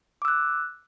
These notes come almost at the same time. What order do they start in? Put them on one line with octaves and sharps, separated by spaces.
D6 E6 F#6